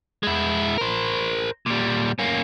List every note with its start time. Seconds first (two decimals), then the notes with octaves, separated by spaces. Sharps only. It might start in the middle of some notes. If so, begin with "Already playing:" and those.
0.23 G#3 E4
0.78 A#4 C5
1.66 A#2 G3
2.19 A#3 C#4